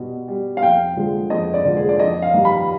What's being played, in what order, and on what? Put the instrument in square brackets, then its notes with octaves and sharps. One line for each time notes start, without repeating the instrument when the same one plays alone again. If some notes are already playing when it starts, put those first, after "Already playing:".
Already playing: [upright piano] B2 G3
G3
F5
F2 G5
D3 F3 G#3
F2 D#5
D5
D3 F3 G#3
G#4
D5
F2 D#5
F5
D#3 G3
B5